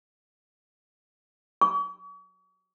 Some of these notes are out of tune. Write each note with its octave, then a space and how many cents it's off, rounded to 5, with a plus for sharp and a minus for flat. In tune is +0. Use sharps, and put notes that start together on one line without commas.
C#6 +40